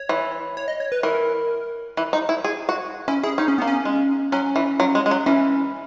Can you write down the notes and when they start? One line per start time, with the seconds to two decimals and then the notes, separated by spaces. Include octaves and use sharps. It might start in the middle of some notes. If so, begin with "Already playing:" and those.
Already playing: C#5
0.09 E3
0.57 C#5
0.68 D#5
0.80 C#5
0.92 B4
1.03 E3 A#4
1.97 E3
2.13 D#4
2.29 E4
2.44 G#4
2.69 F#4
3.08 C#4 E4
3.23 E4 G#4
3.38 C#4 D#4
3.48 C#4
3.58 A#3 B3
3.67 C#4
3.85 G#3
4.32 F#3 C#4
4.56 E3
4.80 F#3
4.95 G#3
5.06 G#3
5.11 F#3
5.26 E3 C#4